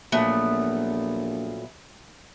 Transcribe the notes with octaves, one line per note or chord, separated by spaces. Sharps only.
A#1 A#2 F#3 A3 B3